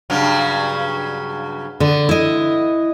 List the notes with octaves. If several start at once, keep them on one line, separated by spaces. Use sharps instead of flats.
G2 C#3 F#3
D3 B3
E4 D#5